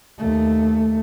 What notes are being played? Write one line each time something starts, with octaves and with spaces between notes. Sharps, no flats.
D#2 A3